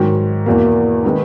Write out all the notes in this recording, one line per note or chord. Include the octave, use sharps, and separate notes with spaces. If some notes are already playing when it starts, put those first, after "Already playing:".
Already playing: G#2 D#3 F#3
E2 B2 A#3
D#3 G#3 B3 D#4